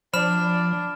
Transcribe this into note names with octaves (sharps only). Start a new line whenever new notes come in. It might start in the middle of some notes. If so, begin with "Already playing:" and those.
F3 D4 B5 F6 E7